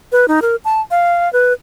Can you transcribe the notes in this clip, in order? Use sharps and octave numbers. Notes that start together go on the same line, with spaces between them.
B4
D#4
A#4
A5
F5
B4